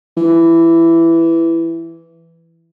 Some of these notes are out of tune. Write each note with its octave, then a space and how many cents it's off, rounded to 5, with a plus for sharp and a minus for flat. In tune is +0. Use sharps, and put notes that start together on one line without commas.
E3 +10